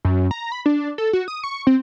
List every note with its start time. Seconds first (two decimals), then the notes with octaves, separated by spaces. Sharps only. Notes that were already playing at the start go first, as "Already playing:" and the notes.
0.05 F#2
0.31 A#5
0.52 B5
0.66 D4
0.98 A4
1.13 F#4
1.28 D#6
1.44 C#6
1.67 C4